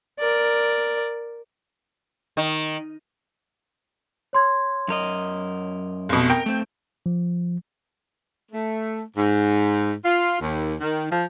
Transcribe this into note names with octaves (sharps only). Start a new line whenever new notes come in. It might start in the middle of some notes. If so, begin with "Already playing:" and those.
A#4 D5
D#3
C#5 C6 G#6
F#2 A#4 D#5
F1 B2
A#4 G5
A3 C4
F3
A3
G#2
F4
D#2
D#3
F3